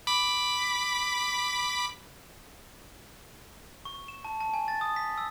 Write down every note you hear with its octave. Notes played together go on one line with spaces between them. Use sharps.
B5 D6 B6
C#6
E7
A5
A5
G#5
A6
D#6
B6
E6